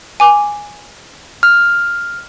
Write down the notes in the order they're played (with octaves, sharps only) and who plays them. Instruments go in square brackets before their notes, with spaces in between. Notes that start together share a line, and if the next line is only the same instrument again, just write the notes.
[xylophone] G#5 D6
[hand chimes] F6